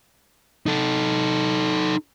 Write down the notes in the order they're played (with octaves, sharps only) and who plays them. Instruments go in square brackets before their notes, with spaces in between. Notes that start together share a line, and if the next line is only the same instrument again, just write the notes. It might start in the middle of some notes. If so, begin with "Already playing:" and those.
[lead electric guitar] D#4 A4